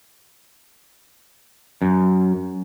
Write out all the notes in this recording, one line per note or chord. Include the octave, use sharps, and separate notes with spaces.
F#2